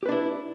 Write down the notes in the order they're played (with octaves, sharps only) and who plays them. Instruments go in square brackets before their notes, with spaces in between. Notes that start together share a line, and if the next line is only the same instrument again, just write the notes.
[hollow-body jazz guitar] G4
B4
D4
E4